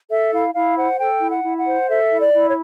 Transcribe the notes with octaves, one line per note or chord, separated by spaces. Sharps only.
A4 E5
E4 F5
E4 F5
C5 F#5
A4 G5
E4
F#5
E4
F#5
C5
A4 E5
E4
D5
E4
C#5